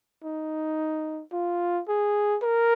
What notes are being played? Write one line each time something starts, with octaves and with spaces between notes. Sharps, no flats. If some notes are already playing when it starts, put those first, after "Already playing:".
D#4
F4
G#4
A#4